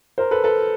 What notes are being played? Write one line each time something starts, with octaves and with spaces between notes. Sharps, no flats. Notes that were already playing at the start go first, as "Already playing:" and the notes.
A#4 C5
A4 B4
A4 B4